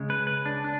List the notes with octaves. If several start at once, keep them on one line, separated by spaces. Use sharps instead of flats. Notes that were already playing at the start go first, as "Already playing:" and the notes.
Already playing: C#3 G#3 C#4
B4
B4
D4
D4